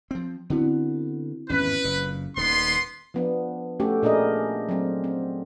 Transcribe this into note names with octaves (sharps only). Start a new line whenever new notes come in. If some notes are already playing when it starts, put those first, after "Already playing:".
F3 C4
D3 B3 C4 E4 F#4
G#1 E2 G2 C#4 B4
F#1 A#2
D#1 D#3 B3 C6
F3 B3 D4
A3 C#4 F#4 G4 A4
A#2 D4 G#4 A#4 D#5
F#3 C4
C4